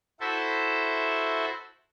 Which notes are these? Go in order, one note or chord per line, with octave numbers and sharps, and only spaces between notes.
E4 F#4 A4 C5 E5